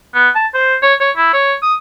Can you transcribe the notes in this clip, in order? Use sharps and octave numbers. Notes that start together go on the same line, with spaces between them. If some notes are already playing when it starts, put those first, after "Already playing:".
B3
A5
C5
C#5
C#5
E4
C#5
D#6